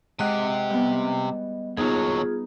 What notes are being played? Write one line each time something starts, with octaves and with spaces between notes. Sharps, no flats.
C3 G#3 G4 D#5 F#5 F#6
G3 B3
D#2 F#3 B3 D#4 F4 G#4